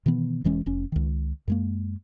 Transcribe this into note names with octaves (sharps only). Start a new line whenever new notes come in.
B2 D#3 E3 B3
E1 E3 G#3 C#4
F1 C#4
C#2 D#3
F#2 G#3 A#3